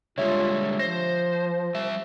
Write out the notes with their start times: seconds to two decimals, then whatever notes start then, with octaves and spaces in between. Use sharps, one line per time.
0.18 D3 G3 G#3 F4 C#5 E5
0.79 F3 C5 A#6
1.75 G3 E5